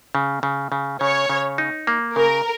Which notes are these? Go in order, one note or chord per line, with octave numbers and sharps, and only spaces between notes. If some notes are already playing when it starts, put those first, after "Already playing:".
C#3
C#3
C#3
C#3 C#5
C#3
D#4
A#3
C#3 A#4